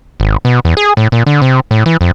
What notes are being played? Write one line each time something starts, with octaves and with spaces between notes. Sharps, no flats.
G#1
B2
E2
G#4
A2
A#2
D3
C3
A2
E3
F2